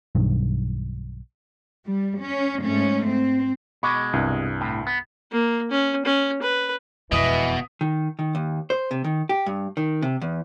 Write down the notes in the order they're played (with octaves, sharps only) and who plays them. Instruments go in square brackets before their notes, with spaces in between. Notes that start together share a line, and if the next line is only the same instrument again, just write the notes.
[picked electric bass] B1 G2 D#3
[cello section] G3
C#4
G#2 A3 C#4
C4
[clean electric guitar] B2 G#3 [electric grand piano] B5 C#6 D6
[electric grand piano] C2 G2
[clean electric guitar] A2
B3
[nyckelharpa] A#3
C#4
C#4
B4
[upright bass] E1 F2 [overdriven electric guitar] B2 [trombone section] E3 [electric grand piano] D#5 D#6 B6
[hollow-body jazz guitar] D#3
D#3
D#2
C5
C3
D#3
G4
G2
D#3
C3
E2